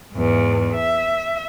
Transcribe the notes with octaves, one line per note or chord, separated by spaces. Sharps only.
E2 G#2
E5